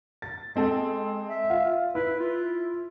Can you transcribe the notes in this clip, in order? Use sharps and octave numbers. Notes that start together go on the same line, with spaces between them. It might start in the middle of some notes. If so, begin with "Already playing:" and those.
A6
G#3 C4 A4
E5
F4
E4 B4
F4